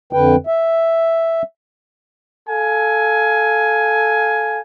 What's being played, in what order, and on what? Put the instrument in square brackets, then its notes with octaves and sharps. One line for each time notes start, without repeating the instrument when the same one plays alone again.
[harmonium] F2 D3 B4 G5
E5
[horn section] A4 F5 G#5